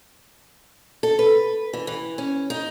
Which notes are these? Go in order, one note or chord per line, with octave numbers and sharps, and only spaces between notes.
A4
B4
E3
E3
C#4
D#4